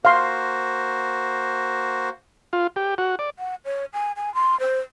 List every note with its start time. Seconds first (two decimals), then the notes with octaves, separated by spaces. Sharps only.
0.05 A#3 F#4 C5 F5 C6
2.53 F4
2.76 G4
2.98 F#4
3.19 D5
3.39 F#5
3.65 C#5
3.93 G#5
4.16 G#5
4.35 C6
4.60 C5